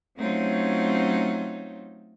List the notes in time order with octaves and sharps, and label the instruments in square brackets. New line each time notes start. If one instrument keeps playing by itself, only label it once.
[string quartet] F#3 A3 C4 C#4 D#4 F4